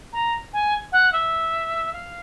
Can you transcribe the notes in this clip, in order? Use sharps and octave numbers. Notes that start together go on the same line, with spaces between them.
A#5
G#5
F#5
E5
F5